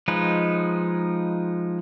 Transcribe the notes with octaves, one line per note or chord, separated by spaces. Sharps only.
F3 G#3 D#4 B4